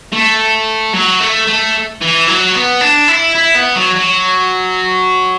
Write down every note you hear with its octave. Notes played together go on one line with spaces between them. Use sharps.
A3
F#3
A3
A3
E3
F#3
B3
D4
E4
E4
B3
F#3
F#3